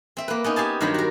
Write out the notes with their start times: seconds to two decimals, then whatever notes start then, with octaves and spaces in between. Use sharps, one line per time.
0.17 C4 E5
0.28 A#3 B4
0.44 B3 C#4 D#4
0.56 G4 F5 G#5 A5
0.81 G2 D#3 F#3 C4 G4 B5
0.94 F#4 A#4